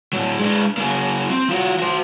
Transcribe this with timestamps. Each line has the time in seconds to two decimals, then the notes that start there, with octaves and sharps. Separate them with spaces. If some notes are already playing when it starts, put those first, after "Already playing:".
0.13 A2 F#3
0.38 G#3 D4
0.77 F#3 A#3
1.30 C4
1.49 F3 F#4
1.80 F#4 C5